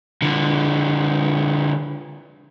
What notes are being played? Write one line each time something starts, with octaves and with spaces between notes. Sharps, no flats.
D3 F3